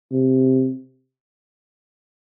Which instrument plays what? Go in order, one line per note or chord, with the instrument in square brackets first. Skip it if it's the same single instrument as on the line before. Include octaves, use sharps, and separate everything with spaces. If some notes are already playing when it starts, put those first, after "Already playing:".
[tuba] C3